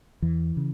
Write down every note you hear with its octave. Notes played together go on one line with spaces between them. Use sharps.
E2 E3
C#3